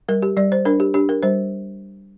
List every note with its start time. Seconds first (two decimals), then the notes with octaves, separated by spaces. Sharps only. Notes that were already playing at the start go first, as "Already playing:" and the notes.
0.08 G3 A#4
0.22 G4
0.37 G3 D5
0.52 C5
0.65 D4 A#4
0.80 G4
0.94 D4 G4
1.09 A#4
1.23 G3 C5